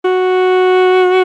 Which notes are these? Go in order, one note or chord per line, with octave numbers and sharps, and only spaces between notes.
F#4